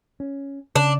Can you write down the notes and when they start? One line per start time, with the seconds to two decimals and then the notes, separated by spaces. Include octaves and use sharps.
0.20 C#4
0.75 C#3 D4